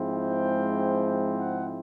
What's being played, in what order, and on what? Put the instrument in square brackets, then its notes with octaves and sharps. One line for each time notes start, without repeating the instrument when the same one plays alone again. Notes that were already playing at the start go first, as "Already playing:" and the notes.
Already playing: [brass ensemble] G#2 F3 G#3 C4 E4
G5
F#5